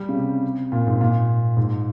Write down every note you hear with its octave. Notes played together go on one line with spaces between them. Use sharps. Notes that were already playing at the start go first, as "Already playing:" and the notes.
Already playing: G3
C#3
C3
A#2
G#2
A#2
G#2